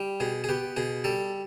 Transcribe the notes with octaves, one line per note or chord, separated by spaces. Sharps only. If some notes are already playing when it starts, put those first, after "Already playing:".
Already playing: G3
B2 G#4
G#4
B3 G4
B2 G#4
G3 A4